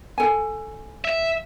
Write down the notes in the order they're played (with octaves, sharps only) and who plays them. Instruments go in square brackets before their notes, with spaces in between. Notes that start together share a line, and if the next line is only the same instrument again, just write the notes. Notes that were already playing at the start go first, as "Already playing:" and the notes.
[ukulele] A4 G#5
[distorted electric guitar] E5